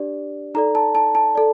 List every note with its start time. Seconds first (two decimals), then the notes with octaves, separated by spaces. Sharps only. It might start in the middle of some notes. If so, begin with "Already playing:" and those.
Already playing: D4 G4 D5
0.55 D#4 A4 D5 A#5
0.75 A5
0.95 A5
1.15 A5
1.35 A4 D5